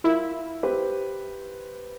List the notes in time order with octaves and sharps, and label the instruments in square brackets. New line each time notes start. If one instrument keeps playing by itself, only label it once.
[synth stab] E4 [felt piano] F4 A#4 E5
[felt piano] G4 B4 C5